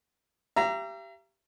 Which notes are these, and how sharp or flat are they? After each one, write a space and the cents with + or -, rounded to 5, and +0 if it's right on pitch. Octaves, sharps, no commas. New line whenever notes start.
G4 -10 E5 +45 A#5 +0